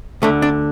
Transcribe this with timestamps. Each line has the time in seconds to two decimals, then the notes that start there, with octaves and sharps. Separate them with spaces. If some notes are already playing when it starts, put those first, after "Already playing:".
0.22 D2 D3 A3
0.42 D4